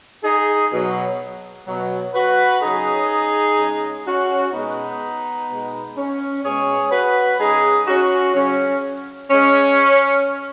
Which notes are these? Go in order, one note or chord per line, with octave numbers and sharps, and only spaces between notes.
D#4 G#4
B2 F#3
B2 F#3
F#4 B4
C#3 F#3 D#4 G#4
C#3 G#3
C#4 F#4
B2 G#3 B3 D#4
B2 G#3
C#4
B2 G#3 G#4 C#5
F#4 B4
C#3 G#3 D#4 G#4
C#4 F#4
C#3 F#3 C#4
C#3 G#3 C#4